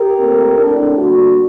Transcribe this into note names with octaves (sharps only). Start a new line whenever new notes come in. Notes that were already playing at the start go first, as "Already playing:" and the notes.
Already playing: G4 A#4
A#2 A3 C4
A2 A3 C4 D4
D3 G3 A#3 D4 F#4